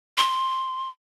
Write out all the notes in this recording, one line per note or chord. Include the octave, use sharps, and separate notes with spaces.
C6